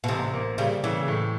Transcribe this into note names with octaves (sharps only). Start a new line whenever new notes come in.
B2
A1 C3
A#3
C#3 G3
C#3 E3
A2